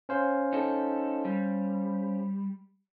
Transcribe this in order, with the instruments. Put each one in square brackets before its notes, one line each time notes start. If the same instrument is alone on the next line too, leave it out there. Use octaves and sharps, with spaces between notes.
[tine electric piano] C#4 C5 F5
[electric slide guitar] D#4 A4
G3